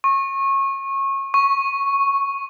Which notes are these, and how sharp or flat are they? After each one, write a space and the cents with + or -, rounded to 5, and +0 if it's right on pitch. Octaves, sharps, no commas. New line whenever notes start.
C#6 -25
C#6 -5